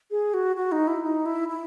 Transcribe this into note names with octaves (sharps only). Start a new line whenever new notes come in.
G#4
F#4
F#4
D#4
E4
D#4
E4
E4